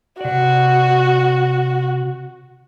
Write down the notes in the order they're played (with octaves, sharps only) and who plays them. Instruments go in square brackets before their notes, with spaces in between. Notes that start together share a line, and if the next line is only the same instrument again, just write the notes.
[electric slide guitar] C3 D5 [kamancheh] F#4